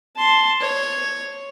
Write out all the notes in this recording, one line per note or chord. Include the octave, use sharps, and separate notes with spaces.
A5 C6
C#5